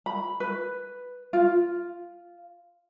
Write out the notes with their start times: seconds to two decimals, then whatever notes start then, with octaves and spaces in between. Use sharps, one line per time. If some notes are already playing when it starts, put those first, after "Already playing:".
0.06 B5
0.40 B4
1.33 F4